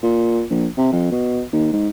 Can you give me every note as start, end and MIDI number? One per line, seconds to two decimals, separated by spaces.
0.03 0.43 46
0.50 0.67 34
0.77 0.88 48
0.92 1.11 41
1.12 1.42 47
1.53 1.68 39
1.73 1.88 44